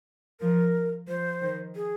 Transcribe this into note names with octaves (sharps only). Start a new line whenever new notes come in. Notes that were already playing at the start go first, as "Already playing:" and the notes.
F3 A#4
F3 C5
D#3
G#4